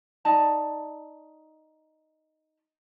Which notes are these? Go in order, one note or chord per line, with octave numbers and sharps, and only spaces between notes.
D#4 D5 A5